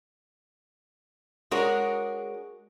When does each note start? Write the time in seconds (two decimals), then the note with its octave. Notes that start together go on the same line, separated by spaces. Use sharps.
1.51 G#3 D4 F#4 G#4 A#4 C#5